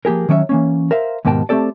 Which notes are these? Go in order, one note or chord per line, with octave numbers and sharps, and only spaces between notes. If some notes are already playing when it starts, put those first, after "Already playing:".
F3 A#3 G4 G#4 A#4
D#3 F#3 C#4 D5 E5
E3 A#3 C#4
A#4 C5 E5 F5
D#2 G#2 B2 A#3 G5 A5
A3 C4 G4 A4 D5